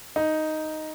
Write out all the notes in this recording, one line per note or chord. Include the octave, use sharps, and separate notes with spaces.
D#4